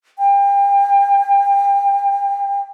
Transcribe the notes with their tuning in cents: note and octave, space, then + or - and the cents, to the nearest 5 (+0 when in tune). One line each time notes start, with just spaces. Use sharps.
G5 +35